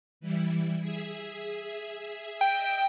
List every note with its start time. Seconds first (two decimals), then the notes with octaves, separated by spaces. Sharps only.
0.20 E3 G3 E4
0.80 G#4 E5
2.41 D#5 E5 G5